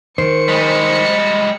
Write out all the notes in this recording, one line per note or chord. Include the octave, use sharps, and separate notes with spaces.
D#3 C5 C#7
G3 G#3